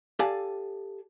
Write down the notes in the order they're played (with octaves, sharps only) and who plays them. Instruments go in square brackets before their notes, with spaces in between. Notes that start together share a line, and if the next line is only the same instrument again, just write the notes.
[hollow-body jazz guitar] G4 A4 D5 F5 G#5 A5